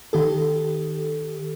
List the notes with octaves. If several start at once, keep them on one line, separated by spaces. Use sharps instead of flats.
D#3 G4 A4